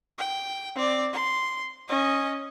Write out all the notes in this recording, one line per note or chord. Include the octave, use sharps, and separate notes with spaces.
G5
C4 D5
C6
C#4 D#5